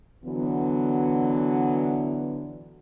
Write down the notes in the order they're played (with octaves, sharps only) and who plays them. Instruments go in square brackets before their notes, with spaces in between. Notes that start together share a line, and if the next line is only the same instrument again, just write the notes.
[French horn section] D3 E3 F#3 B3